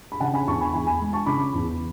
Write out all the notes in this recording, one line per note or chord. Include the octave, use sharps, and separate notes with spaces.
B5
C#3 F#5 A5
G#5 B5
E2 A5 C#6
G#5 B5
E2 G#5 B5
G#5 B5
G#3
A5 C#6
C#3 B5 D6
E2